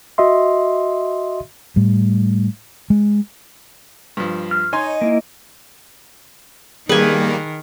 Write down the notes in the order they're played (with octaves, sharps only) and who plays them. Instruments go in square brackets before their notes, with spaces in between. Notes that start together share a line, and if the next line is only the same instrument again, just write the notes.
[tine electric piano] F#4 D#5 E5 C6
[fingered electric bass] A2 G3
G#3
[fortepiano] G2 F3
[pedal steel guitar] F6
[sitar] D#4 [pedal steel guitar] C#5 [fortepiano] G#5 C6
[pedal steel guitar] A#3 E4
[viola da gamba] D#3 [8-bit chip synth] G3 A#3 [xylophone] G#4 [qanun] B4 G#5